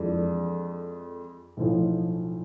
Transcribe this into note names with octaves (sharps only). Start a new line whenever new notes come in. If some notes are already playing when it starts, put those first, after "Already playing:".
Already playing: F2 E3 G#3 D4 A4
B1 A2 F3